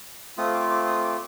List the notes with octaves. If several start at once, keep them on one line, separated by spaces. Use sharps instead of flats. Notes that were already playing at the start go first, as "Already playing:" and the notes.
A3 C4 F4 D#6
D6
D6
D#6
D6